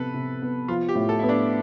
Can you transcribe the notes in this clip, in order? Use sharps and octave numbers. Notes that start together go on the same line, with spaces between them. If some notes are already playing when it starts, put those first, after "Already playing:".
Already playing: C3 B3 A4 B4
C3
B3
F3 F4
G4
A2
A4
B3 E4
D4